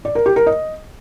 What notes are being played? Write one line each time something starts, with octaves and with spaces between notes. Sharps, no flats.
D5
A#4
G4
A#4
D#5